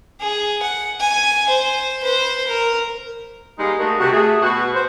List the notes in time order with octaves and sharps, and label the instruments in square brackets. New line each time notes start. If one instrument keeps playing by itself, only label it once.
[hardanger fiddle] G#4
F#5
G#5
C5
B4 C5
A#4
[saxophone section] G3 G#3 A#3 D#4
G3 A3 D#4 F#4 G#4 A#4
C3 F#4
A3 G#4
B2 F#4
C5